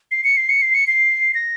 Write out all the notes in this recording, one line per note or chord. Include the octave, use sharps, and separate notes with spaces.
C7
C#7
C7
C#7
C7
C#7
C7
A#6